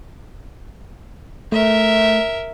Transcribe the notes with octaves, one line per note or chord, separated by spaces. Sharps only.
A3 A#4 E5